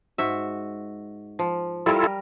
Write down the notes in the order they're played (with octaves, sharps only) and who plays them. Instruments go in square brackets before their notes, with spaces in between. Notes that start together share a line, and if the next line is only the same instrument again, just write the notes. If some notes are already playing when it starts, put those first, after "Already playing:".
[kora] G#2 F#4 E5
F3
[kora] G3 A#4 [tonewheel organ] E4 F4 A4